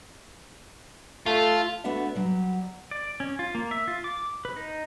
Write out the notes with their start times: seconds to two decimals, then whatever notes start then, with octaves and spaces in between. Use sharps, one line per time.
1.26 A3 F4
1.84 A3 B3 D4 F#4 E5
2.15 F#3 G3
2.91 D5
3.20 C#4
3.39 F4
3.55 A#3
3.71 E5
3.88 F4
4.04 D6
4.45 B4
4.56 D#4